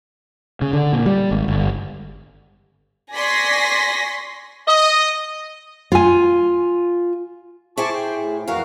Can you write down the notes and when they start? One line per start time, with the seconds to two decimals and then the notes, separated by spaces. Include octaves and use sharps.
0.62 C#3
0.73 D3
0.93 A#2
1.06 G3
1.31 G#1
1.48 G1
3.14 D5 G#5 C6 C#6 A#6 B6
4.68 D#5
5.92 F4 G#5
7.77 E4 G#4 C5 A5 C#6 D6
7.94 G5
8.16 A2
8.48 F2 E3 F#4 A#4 F5